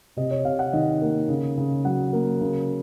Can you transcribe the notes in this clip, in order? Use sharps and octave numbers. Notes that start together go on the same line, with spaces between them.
C3 D#5
C#5
C3 F5
F#5
D#3 D#5
A#3
C#3
C#3
F#3 F#5
A#3
C#3